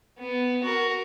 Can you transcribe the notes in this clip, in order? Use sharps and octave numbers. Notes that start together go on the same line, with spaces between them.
B3
F#4 A#4